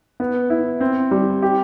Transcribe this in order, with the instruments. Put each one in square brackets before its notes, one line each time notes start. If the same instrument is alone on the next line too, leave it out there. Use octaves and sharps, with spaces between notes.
[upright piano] B3
E4
C4
G3
G4